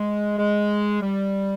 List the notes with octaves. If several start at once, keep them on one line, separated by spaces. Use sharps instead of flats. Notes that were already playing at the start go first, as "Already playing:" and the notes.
Already playing: G#3
G#3
G3